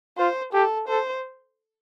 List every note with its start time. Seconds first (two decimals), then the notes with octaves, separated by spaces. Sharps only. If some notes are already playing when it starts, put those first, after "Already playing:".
0.18 F4 C5
0.53 G4 A4
0.88 A4 C5